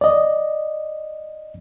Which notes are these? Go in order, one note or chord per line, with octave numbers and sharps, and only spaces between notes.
D5 D#5